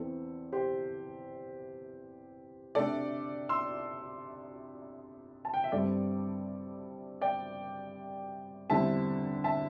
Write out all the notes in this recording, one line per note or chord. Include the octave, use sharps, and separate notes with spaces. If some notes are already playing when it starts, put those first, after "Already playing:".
Already playing: E2 E3 C4 A4
G4 C5
C3 A3 D4 A4 D5
C6 E6
A5
G5
E5
G2 G3 C4 A4 D5
D5 G5
E2 D3 G3 C4 E5 A5
E5 A5